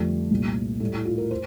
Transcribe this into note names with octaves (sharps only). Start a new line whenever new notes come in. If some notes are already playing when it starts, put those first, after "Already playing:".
Already playing: F2 D3 G3 A3
C2 A#2 G3
A2 G3 A3
E4
F4
A#4
C5